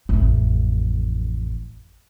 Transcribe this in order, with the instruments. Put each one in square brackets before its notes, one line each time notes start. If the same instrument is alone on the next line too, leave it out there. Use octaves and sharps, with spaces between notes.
[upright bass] A1 F2